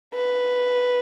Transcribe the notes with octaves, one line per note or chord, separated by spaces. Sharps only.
B4